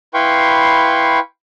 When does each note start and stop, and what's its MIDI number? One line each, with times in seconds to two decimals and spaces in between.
0.14 1.19 64
0.14 1.19 71
0.14 1.19 77
0.14 1.19 79
0.14 1.19 84
0.14 1.19 85